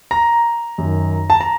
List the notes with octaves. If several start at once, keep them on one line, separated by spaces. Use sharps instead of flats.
A#5
F#2 D#3
A5
A#5